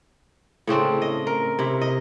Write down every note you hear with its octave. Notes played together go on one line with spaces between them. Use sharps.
A2 C#3 C4 D4
D#5
A#4
C3 E4
D#5